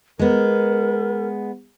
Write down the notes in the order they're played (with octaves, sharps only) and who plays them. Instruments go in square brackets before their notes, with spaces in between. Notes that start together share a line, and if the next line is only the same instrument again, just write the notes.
[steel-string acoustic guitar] G#3 B3 [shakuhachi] A#4